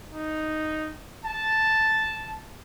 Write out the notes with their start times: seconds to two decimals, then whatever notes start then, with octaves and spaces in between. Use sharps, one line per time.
0.12 D#4
1.25 A5